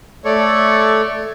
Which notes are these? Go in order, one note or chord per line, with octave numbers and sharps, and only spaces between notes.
A3 A4 C#5 D5 C#6